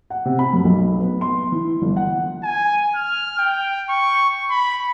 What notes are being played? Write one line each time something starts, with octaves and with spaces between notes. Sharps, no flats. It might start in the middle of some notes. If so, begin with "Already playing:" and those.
F#5
C3
B5
F#2
B1
B3
C6
E3
G1
F#5
G#5
F6
G5
C#6
B5